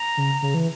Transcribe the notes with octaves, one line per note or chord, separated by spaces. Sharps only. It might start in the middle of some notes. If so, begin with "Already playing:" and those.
Already playing: A#5
C#3
C#3
E3